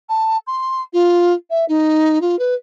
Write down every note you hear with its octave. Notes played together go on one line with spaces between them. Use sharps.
A5
C6
F4
E5
D#4
F4
B4